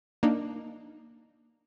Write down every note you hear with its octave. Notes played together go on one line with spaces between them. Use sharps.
A#3 D4 D#4